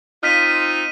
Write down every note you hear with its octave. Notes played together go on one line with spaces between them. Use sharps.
C4 D#4 F4 F6 B6 D#7